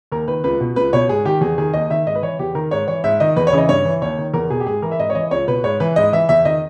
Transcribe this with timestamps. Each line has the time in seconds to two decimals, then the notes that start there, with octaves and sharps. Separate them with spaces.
0.12 D#2 A#4
0.28 D#3 B4
0.44 C#2 B4
0.60 B2
0.76 C#2 B4
0.93 B2 C#5
1.09 G#2 G#4
1.25 D#3 G4
1.41 E2 G#4
1.58 D#3 G#4
1.73 D#2 D#5
1.90 D#3 E5
2.06 G#2 D#5
2.15 B4
2.22 E3 C#5
2.39 E2 G4
2.55 D#3 A#4
2.71 G#2 C#5
2.88 E3 C#5
3.04 G#2 E5
3.20 D#3 D#5
3.36 E2 B4
3.47 C#5
3.53 C#3 E3 D#5
3.69 G2 C#5
3.85 E3
4.02 D#2 C#5
4.18 D#3
4.33 E2 A#4
4.50 B2 G#4
4.60 G4
4.66 G#2 G#4
4.82 E3 A#4
4.92 E5
4.99 G#2 D#5
5.10 C#5
5.15 E3 D#5
5.31 C#2 C#5
5.47 B2 B4
5.64 G#2 C#5
5.80 E3 B4
5.96 G#2 D#5
6.13 E3 E5
6.29 E2 E5
6.45 D#3 D#5